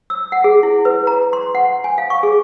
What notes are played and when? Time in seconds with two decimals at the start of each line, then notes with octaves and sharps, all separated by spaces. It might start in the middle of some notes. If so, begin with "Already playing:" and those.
0.10 E6
0.32 F#5
0.44 G#4
0.63 E4
0.85 B4
1.07 A#5
1.33 C6
1.55 F#5
1.84 G#5
1.98 F5
2.10 C#6
2.23 G#4